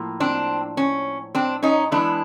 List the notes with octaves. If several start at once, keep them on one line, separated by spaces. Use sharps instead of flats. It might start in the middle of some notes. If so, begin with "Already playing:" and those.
Already playing: A2 F3 A#3
C4 D4
C#4
C4 D4
C#4 D#4
E3 G#3 B3 D4 E4